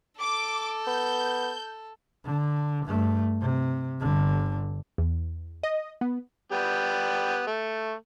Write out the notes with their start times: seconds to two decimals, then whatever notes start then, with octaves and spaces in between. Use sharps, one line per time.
0.20 A4 D6
0.87 B3 G6
2.25 D3
2.85 G2 A3
3.41 C3
4.00 G1 D3
4.98 E2
5.63 D#5
6.01 B3
6.52 G3 B3 G4
7.47 A3